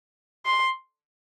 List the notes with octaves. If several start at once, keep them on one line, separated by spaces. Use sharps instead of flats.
C6